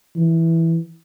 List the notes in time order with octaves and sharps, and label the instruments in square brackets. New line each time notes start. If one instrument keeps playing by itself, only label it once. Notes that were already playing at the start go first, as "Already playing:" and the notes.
[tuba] E3